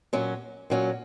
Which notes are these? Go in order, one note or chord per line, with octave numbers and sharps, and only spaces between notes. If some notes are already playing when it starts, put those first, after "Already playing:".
A#2 F#3 C#4
A#2 F#3 C#4